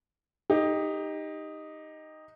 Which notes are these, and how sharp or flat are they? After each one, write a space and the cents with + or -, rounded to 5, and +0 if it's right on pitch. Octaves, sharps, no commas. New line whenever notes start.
D#4 +0 G4 +20